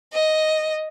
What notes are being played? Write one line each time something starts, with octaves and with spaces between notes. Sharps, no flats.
D#5